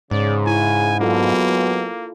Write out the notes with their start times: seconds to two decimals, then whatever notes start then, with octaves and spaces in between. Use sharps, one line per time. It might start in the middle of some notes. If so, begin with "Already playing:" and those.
0.11 G#2 C#3 D5
0.47 E4 G#5
1.00 F#3 G#3 A#3 B3 D4 F4 A4